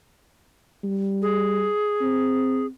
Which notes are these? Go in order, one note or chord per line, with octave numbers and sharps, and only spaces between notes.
G3
G#4
C4